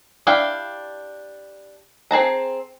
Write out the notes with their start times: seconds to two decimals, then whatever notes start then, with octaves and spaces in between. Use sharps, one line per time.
0.27 D4 E4 G4 F5 G5
2.11 C4 G#4 A5 A#5